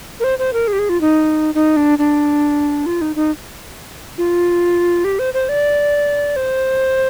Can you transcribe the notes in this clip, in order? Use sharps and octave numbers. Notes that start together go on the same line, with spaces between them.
A#4
C5
C5
A#4
G#4
G4
G#4
F4
D#4
D#4
D4
D4
F4
D#4
D#4
F4
G4
C5
C5
D5
C5